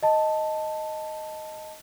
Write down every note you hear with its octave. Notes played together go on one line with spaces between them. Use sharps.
D#5 A5